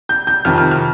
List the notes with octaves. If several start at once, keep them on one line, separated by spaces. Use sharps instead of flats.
G6
G6
F2 C3 D#3 F6
F6
F6